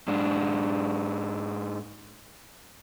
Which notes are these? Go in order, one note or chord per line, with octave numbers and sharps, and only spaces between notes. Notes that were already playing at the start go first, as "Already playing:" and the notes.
G#2 D4